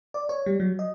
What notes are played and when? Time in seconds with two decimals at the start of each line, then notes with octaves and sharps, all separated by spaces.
0.14 D5
0.29 C#5
0.46 G3
0.60 F#3
0.79 D#5